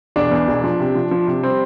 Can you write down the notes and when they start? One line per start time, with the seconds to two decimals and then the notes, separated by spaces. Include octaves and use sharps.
0.16 E1 D4
0.31 E2
0.48 E1
0.64 F3
0.80 C3
0.95 F3
1.11 F3
1.27 C3
1.43 G3 C4